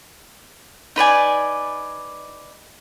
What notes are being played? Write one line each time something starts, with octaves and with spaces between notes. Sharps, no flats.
D#4 B4 D5 G#5